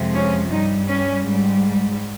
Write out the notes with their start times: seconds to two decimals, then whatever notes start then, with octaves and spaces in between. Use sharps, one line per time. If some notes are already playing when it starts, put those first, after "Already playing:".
Already playing: F2 C3 F3 G#3
0.14 C#4
0.51 G2 G3 D#4
0.88 C#4
1.25 G#2 G3